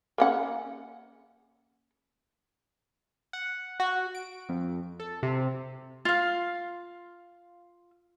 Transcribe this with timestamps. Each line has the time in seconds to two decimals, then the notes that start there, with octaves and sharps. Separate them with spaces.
0.18 A#3 C#4 F#5
3.33 F#5
3.80 F#4
4.15 D7
4.49 F2
5.00 A4
5.23 C3
6.05 F4 F5